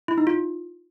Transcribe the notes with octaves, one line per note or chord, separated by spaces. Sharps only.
E4
D#4
F4